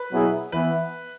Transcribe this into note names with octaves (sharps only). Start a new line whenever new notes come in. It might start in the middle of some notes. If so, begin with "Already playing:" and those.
Already playing: B4
B2 F#3 B3 E4 G#4
E3 B3 E4 B4